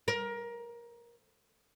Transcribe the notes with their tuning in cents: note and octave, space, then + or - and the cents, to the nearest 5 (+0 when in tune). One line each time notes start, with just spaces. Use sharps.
A#4 +20